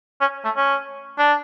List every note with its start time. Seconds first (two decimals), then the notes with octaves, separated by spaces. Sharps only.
0.21 C#4
0.45 A3
0.57 C#4
1.18 D4